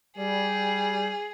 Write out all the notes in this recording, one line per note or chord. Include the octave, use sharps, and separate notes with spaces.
G3 G#4